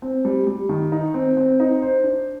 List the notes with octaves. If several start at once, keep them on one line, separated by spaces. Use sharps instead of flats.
C4
G3
G3
D#3
D#4
C4
C4
D#4
C5
D4